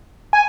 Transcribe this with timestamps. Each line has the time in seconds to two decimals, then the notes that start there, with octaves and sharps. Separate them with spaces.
0.33 G#5